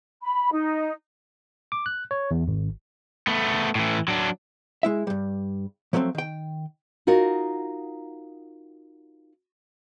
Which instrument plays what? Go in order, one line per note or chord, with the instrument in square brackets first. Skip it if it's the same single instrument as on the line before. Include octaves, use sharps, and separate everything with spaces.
[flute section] B5
D#4
[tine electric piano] D6
F#6
C#5
E2
G#1
[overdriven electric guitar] A3 B3
A2 E3
F#3 D4
[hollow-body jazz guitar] G#3 E4 E5
G2 G3
F3 F#3 A3 A#3 C4
D#3 G5
[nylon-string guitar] D#4 F4 F#4 A#4